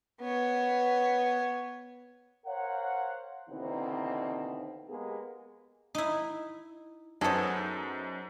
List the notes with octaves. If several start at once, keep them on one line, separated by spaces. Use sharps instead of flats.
B3 C#5
A#4 C5 C#5 F5 F#5
D#2 B2 D3 E3 C4 D#4
G#3 A#3 B3 G4 G#4
D#4 E4
F#2 B3 D#4 G#4 A4 C5 C#5